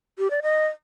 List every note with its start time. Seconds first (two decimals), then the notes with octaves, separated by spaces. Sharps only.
0.19 G4
0.31 D5
0.42 D#5